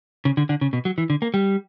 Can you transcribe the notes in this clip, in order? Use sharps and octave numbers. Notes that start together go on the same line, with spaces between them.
C#3
D3
D3
C#3
B2
F#3
E3
D3
A#3
G3